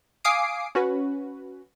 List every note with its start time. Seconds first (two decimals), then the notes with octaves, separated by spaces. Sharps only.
0.24 F5 G#5 D6 D#6 C7 D7
0.75 C#4 F#4 B4